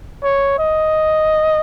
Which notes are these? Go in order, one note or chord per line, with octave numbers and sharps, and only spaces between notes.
C#5
D#5